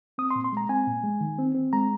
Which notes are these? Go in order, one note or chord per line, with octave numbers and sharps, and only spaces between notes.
C4 D#6
C6
A#2
C6
G#3 A#5
C4 G#5
A#2
G#3
D#3
C4
C4
G#3 A#5